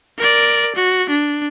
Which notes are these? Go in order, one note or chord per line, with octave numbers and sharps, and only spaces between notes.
A#4 D5
F#4
D4